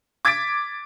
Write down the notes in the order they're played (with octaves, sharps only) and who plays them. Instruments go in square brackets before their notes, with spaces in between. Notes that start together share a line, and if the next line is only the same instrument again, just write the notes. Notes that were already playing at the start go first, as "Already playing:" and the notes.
[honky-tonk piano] D6 G#6 A6 B6 D7